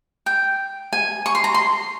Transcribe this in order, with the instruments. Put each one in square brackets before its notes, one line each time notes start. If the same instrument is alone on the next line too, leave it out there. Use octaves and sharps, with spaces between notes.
[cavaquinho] G5
G#5
C#6
C6
A#5
C6